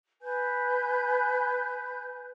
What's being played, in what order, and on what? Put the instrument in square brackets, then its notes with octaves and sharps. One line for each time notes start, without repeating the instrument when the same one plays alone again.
[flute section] B4 G#5 G6